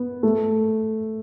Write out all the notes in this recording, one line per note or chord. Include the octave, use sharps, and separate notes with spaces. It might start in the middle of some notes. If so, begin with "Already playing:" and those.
Already playing: B3
A3